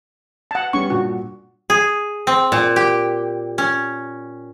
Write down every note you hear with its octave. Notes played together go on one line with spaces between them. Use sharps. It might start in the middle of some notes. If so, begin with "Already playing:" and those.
F#5 A5
G3 B3 C#4 C#6
G2 A#2 F#4
G#4
C4
A#2
G4
C#4